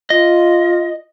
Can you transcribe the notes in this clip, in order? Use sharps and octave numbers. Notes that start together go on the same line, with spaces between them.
F4 D#5